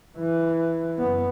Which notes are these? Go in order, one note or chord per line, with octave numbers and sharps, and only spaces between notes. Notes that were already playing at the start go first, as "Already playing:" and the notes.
E3
F#1 B3